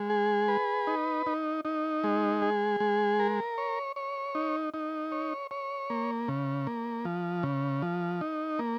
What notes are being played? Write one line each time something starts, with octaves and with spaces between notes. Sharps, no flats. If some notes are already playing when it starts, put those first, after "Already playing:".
Already playing: G#3
G#4
B4
D#4
D#4
D#4
G#3
G#4
G#3
A#4
C#5
C#5
D#4
D#4
C#5
C#5
A#3
C#3
A#3
F3
C#3
F3
D#4
A#3